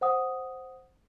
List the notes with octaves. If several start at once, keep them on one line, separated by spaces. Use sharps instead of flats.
C5 F#5 D#6